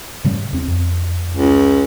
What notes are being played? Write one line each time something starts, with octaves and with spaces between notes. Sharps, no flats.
G#2 C#3 G3
E2 C4
F2
C#2